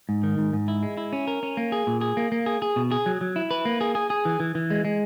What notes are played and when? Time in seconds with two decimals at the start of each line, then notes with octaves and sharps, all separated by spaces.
0.09 G#2
0.23 D#3
0.38 G#2
0.53 G#2
0.68 E4
0.83 G#3
0.97 E4
1.13 C#4
1.27 A#4
1.43 C#4
1.57 A#3
1.72 G#4
1.87 A#2
2.01 G#4
2.17 A#3
2.32 A#3
2.46 G#4
2.62 G#4
2.76 B2
2.91 G#4
3.06 F#3
3.21 F#3
3.36 E4
3.51 B4
3.65 A#3
3.81 G#4
3.95 G#4
4.10 G#4
4.25 E3
4.40 E3
4.55 E3
4.70 G#3
4.85 G#3